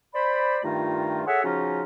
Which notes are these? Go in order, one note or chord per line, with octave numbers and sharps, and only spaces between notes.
C5 D5 B5
G2 D#3 A3 D#4 F4
G#4 A4 C#5 E5 F#5
C#3 F3 C#4 D#4 F4 F#4